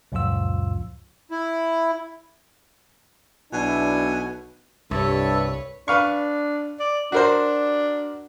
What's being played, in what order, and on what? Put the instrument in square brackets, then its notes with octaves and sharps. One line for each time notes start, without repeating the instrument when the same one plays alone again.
[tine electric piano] C#2 F#2 A#2 F3 F4 E6
[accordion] E4
[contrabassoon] B1 [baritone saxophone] B2 [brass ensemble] D4 E4 [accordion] G#5
[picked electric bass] C2 [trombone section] G2 [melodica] E4 A4 E5 [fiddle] B4 C#5
[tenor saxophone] D4 [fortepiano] B4 F5 C#6
[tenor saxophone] D5
[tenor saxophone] D4 [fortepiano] F#4 A#4 C5